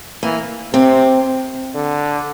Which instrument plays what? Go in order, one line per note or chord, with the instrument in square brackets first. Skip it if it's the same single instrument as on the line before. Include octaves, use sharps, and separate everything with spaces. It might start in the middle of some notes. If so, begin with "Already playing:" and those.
[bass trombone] E3 [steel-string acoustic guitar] A#3
[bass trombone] C3 [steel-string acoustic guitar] C4
[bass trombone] D3